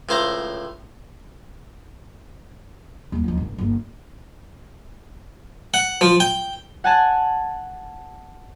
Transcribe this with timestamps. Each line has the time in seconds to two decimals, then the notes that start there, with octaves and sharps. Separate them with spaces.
0.09 C#2 A2 C5 F5 A#5
3.12 D#2 F#3
3.24 D#2 F3
3.37 G1 A2
3.58 G1 A#3
5.74 F#5
6.01 F3
6.20 G5
6.84 F#5 G#5 A5